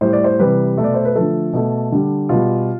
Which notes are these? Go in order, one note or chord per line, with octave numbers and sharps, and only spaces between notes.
A2 G3 C5
D5
C5
C3 E3 G3 B4
B2 A3
D5
C5
B4
D3 F3 A3 A4
B2 A3
D3 G3
B2 G3 F4